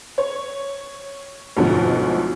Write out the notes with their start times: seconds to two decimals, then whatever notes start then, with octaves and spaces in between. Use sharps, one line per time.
0.18 C#5
1.57 D2 G#2 B2 F3 F#3